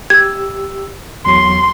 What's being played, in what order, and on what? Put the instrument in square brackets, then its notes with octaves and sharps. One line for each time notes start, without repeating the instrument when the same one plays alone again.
[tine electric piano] G4 E6 [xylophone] G#6
[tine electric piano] E2 F#3 C7 [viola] C6